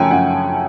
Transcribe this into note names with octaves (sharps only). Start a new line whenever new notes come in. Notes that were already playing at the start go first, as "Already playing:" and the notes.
Already playing: F#2 C#3 F3 A3 G5 G#5
F#2 F#5